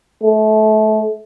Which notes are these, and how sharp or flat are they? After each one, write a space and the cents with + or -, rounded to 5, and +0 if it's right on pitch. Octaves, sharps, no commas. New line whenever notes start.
A3 -30